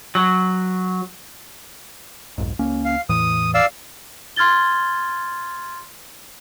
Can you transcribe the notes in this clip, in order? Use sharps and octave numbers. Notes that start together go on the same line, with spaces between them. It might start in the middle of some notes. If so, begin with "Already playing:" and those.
F#3
B1 F2 G#2
C#2 A#3 C#4
F5
E2 A2 E3 D#6
D5 F5 E6
C6 F6 G#6 A6 G7